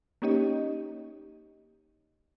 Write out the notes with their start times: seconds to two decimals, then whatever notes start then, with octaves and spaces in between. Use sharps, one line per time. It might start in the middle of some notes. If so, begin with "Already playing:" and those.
0.22 A#3 C#4 D#4 G4 C#5 D#5